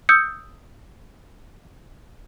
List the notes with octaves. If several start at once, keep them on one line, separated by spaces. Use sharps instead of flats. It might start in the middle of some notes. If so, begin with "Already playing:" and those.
D#6 E6 G6 C#7